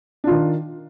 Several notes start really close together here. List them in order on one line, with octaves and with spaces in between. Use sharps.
D4 F4 D#3